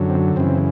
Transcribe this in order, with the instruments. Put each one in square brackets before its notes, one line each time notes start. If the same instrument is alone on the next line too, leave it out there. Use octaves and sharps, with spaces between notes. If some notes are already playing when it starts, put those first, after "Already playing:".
Already playing: [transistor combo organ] F#2 D3 F#3
C4
F#2 C#3 E3 C4